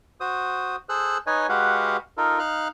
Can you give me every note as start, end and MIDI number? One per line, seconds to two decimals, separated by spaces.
0.20 0.76 66
0.20 0.76 72
0.20 0.76 87
0.89 1.18 68
0.89 1.18 69
0.89 1.18 72
0.89 1.18 88
0.89 1.18 90
1.27 1.47 63
1.27 1.47 71
1.27 1.47 73
1.27 1.47 75
1.27 1.47 80
1.49 1.97 56
1.49 1.97 66
1.49 1.97 67
1.49 1.97 71
1.49 1.97 77
1.49 1.97 78
2.17 2.39 63
2.17 2.39 65
2.17 2.39 69
2.17 2.39 70
2.39 2.68 63
2.39 2.68 77
2.39 2.68 89
2.39 2.68 90